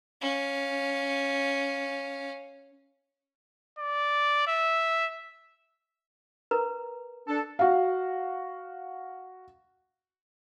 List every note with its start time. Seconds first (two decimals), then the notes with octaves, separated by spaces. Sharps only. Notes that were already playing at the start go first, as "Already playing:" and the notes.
0.21 C#4 F5
3.79 D5
4.47 E5
6.51 A#4 B4 A#5
7.27 D4 A4
7.59 F#4 F5